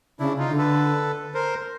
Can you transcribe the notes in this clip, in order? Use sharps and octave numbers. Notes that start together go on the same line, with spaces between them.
C#3 D4 E4
D#4 F4
D3
A4 B4
A#4 C5